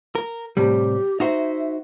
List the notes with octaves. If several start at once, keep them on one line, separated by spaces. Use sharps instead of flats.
A#4
A2 C3 G3 G4
D#4 F#4 C5 E5